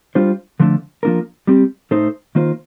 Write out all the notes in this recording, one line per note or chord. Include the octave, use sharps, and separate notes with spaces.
G3 D4 F4 C5
D3 F3 A3 D4
F3 A#3 D4 F4 A#4
G3 C4 G4
A2 A3 D#4 A4 C5
D#3 A#3 F4 C5